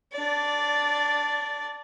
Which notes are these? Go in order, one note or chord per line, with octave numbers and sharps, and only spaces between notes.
D4 D5